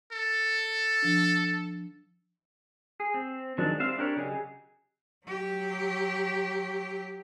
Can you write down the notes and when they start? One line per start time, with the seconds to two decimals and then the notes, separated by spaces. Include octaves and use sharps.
0.12 A4
1.03 F3 D4
3.00 G#4
3.14 C4
3.58 D#3 F3 F#3 G#3 D4
3.79 G3 C4 C5 E5 F5
3.98 D4 G4 A#4 C#5
4.17 C#3 F#3 G4 G#4 D#5
5.27 F#3 G4